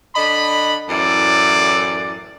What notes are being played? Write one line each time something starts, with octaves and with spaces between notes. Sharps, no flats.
D3 D#5 B5
F#2 A2 E3 D5